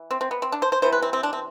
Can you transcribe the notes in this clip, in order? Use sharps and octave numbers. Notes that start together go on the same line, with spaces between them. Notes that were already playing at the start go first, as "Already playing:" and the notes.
Already playing: E3
C4
C4
B3
C4
D4
C5
C5
C3 E3 B3 C5
B4
C4
C4
D4
C4